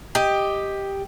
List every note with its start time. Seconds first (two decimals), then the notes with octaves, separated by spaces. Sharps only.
0.15 G4 D#5